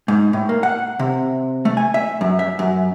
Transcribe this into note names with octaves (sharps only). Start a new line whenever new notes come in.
G#2
A2
A#3
F#5
C3
A3
G#5
E5
F#2
E5
F#2